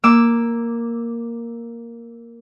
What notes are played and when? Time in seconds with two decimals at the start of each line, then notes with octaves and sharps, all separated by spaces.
0.04 A#3 D6 E6